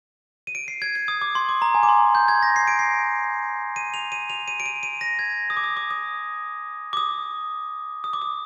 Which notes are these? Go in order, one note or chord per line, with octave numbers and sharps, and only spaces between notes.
D#7
D7
C7
G#6
G#6
D#6
D6
C6
D6
A#5
G#5
D6
C6
G6
G#6
A#6
C7
D7
C7
D#7
F7
D#7
F7
D#7
D7
D#7
D#7
A#6
G#6
D#6
D6
D#6
D6
D#6
D6
D#6
D#6
D6
D#6